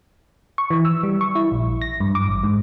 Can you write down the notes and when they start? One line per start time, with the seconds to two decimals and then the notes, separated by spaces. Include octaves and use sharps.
0.58 C#6
0.70 E3
0.85 E6
1.03 G3
1.21 C#6
1.35 E4
1.52 A#1
1.82 A#6
2.00 G2
2.15 D6
2.28 A1
2.43 G#2